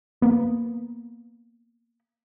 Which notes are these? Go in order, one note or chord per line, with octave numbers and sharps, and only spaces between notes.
A#3 B3